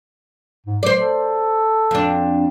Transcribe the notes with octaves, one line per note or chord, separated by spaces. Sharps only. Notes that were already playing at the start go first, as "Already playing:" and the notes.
G#2
F#3 C5 D5
A4
F2 D4